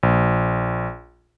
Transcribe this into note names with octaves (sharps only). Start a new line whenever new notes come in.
A#1